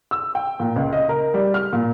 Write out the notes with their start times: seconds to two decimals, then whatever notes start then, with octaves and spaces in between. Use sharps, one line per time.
0.11 E6
0.35 G5
0.60 A#2
0.76 C#2
0.93 D#5
1.09 A#4
1.34 G3
1.54 F6
1.73 A#2